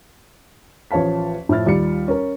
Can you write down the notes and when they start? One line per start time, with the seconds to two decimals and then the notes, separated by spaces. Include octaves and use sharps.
0.91 A1 F3 C#5 F5 A5 B6
1.49 A2 F3 E4 F6 A6
1.66 D#2 G3 F4 C#7
2.08 C#4 A#4